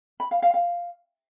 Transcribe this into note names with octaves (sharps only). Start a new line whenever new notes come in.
B5
F5
F5
F5